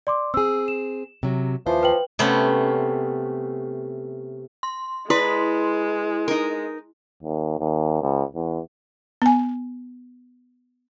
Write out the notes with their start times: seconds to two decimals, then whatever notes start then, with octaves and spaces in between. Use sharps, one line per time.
0.07 D5 C6 D6
0.34 C4 G#4 E6
0.68 E7
1.23 C3 F#3
1.66 D#2 E3 F3 C5
1.83 B4 G5 F#7
2.19 C3 A3 B3 C#4
4.63 C6
5.10 G#3 E4 B4 C6
6.28 D#4 A#4
7.23 D#2
7.59 D#2
8.02 C#2
8.35 E2
9.22 B3 G#5